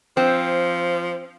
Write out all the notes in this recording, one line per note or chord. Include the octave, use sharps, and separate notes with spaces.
F3 C4